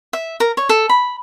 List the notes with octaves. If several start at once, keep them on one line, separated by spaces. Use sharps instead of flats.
E5
A#4
C#5
A4
B5